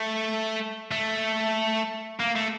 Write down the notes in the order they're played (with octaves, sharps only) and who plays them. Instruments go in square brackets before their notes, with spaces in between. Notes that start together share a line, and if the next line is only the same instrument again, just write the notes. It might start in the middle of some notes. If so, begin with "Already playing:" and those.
Already playing: [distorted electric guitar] A3
A3
A#3
A3